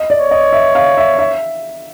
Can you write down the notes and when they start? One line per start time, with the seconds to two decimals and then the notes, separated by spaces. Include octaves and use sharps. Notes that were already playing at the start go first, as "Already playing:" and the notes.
Already playing: D#5
0.10 D5
0.20 C#5
0.31 D#5
0.53 E5
0.75 F5
0.98 E5
1.19 E5